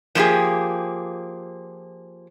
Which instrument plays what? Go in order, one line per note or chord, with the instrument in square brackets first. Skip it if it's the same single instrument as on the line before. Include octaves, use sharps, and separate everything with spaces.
[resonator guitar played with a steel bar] F3 A#3 C#4 E4 G4 G#4